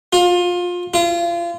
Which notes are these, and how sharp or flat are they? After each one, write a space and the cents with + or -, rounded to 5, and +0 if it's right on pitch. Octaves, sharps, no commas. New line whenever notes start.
F4 +25
F4 -30